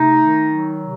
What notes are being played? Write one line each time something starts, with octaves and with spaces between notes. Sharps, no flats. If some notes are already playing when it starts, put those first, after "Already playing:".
Already playing: C3 A3 D#4
D#3
F#3
C3